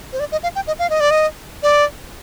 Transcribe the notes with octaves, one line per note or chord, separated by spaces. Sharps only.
C5
D5
D#5
F5
G5
D#5
F5
D#5
D5
D#5
D5